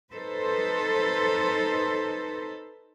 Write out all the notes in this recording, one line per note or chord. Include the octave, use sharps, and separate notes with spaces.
D#4 A4 B4 C5